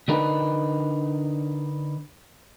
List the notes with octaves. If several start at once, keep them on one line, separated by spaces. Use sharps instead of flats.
D3 D4 D#4 A#4 B4